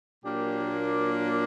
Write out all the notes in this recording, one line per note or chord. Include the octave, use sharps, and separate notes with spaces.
A#2 F#3 A#3 D4 G4